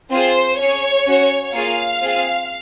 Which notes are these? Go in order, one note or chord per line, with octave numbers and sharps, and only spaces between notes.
C4 F4 G#4 C5
C#4 G#4 C#5
C#4 F#4
A#3 F4 G#4 F5
C4 F4 G#4